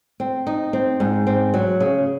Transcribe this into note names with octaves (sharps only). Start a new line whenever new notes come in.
C4
D#4
C4
G#2
C4
F#3
C#3